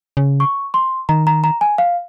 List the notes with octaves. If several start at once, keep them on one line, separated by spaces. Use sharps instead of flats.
C#3
C#6
C6
D#3 A#5
A#5
A#5
G#5
F5